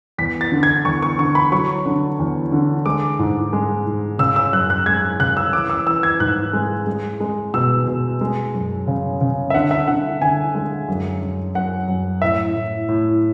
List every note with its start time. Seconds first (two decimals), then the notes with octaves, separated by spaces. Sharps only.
0.18 E2 B6
0.41 A6
0.52 D3
0.63 G#6
0.85 E2 C#6
1.02 C#6
1.19 D3 C#6
1.35 B5
1.52 F#3 C#6
1.86 D3
2.19 E2
2.52 D3
2.86 G#3 D6
3.19 G#2
3.53 G#3
3.87 G#2
4.19 C#3 E6
4.36 E6
4.53 F#2 F#6
4.70 F#6
4.86 G#3 G#6
5.20 C#3 F#6
5.37 E6
5.53 E3 D6
5.70 E6
5.86 E3 E6
6.03 G#6
6.20 G#2 F#6
6.53 G#3
6.87 G#3
7.20 G#3
7.54 B2 E6
7.87 B2
8.21 G#3
8.54 F#2
8.87 C#3
9.21 C#3
9.50 E5
9.54 D3 F#5
9.71 E5
9.88 D3 F#5
10.21 D3 G#5
10.55 G#3
10.88 F#2
11.22 F#2
11.55 F#2 F#5
11.88 F#2
12.22 A2 E5
12.55 A2
12.89 A2